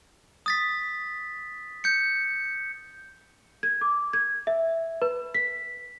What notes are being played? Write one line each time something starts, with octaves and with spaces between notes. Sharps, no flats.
D#6 A6 B6
G6 C#7
G#6
D6
G#6
E5
B4
B6